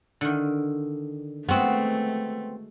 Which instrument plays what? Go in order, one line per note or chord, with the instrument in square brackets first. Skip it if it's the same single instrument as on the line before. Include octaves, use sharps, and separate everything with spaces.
[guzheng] D3 D#3
[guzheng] G#3 F#4 [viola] A3 [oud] B3 C4